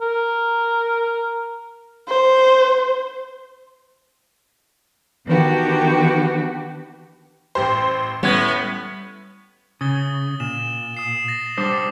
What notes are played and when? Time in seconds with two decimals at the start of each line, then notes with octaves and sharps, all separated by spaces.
0.01 A#4
2.08 C5
5.26 D#3 E3 B3 D4 F#4 G4
7.55 A1 G4 C5
8.23 A2 G3 B3 C#4 G#6
9.81 C#3 D#6 A6 G7
10.40 A#2 E7
10.94 D#6 C7 E7
11.28 A6 A#6
11.58 G3 D4 C5 D6 D#6